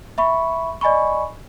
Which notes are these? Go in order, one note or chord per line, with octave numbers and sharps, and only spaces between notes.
E5 B5 C#6
D5 D#5 G#5 B5 C#6